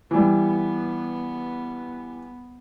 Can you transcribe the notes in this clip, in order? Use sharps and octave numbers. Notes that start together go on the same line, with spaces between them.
E3 G3 B3